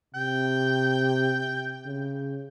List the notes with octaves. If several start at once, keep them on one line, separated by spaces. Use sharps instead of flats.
C3 G5
C#3